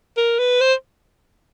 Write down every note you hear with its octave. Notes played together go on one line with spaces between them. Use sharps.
A#4
B4
C5